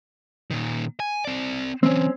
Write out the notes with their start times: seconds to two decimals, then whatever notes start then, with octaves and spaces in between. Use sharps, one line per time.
0.51 A#2 D#3
1.00 G#5
1.25 C4 D5
1.83 E3 F#3 C4 C#4